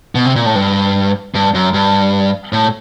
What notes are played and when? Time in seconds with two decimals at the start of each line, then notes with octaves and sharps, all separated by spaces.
0.15 B2
0.25 C3
0.36 A#2
0.46 A2
0.55 G2
1.35 G2
1.54 F#2
1.74 G2
2.53 A2